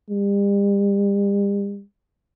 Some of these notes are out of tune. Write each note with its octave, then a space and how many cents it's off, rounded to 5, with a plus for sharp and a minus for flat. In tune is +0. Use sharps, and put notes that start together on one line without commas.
G3 +40